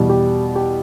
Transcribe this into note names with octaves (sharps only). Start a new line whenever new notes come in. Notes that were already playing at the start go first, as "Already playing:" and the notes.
Already playing: E2 B2 G3
G4
G4